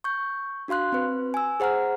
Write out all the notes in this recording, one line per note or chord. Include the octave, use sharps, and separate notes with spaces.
C#6 G6
D4 F#4 F5 C6 F#6
C4 B4
G#5 E6
G#4 C5 F#5 A#5 F6